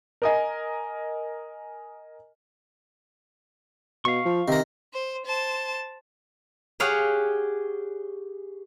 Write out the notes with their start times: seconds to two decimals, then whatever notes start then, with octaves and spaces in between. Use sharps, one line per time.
0.22 A#4 D#5 G#5
4.05 B2 F5 C#6
4.25 F3
4.48 C3 D#3 A#4
4.93 C5
5.26 C5 A5
6.80 G4 G#4 C#5 F5 F#5